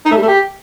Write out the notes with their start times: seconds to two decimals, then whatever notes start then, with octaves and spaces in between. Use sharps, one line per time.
0.06 D#4
0.11 A3
0.17 G3
0.22 A3
0.28 G4